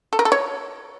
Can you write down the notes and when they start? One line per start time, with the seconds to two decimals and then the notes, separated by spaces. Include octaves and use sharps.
0.13 A4
0.19 A#4
0.25 A4
0.32 C#5